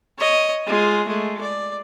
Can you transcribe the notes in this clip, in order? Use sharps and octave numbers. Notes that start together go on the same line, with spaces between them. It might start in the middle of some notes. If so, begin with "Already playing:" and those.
C#5 D#5
G#3 F4
G#3 A3
D5